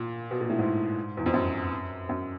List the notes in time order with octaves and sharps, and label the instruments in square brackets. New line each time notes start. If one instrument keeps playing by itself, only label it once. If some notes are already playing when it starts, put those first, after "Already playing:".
Already playing: [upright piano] A#2
B2
A#2
A2
G#2
E2
F2
F#2
F#2